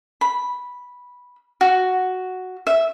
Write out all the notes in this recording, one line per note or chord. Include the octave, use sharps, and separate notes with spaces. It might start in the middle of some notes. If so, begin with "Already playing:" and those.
B5
F#4
E5